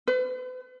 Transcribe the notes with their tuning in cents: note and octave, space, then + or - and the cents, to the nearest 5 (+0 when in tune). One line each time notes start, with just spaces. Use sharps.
B4 +45